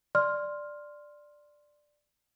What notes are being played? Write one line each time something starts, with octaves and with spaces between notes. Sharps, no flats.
D5 C6 F6